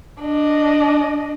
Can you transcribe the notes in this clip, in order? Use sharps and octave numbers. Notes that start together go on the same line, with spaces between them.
D4 D#5